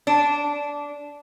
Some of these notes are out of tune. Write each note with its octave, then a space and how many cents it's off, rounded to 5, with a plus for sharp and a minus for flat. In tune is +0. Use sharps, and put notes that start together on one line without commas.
D4 -15